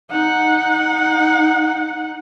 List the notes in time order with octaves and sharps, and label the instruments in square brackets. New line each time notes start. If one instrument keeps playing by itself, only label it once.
[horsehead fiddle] D#4 F#5